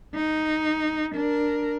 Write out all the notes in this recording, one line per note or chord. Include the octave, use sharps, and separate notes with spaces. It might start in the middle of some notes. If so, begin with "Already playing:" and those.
D#4
D4 A#4